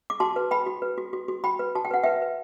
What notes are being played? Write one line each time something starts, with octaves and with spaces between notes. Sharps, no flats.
D6
F#4 A5 C6
B4
B4 G5 B5
F#4
B4
F#4
F#4
F#4
F#4 G5 B5
B4
F#4 A5
G5
B4 F#5
B4 E5 G5
B4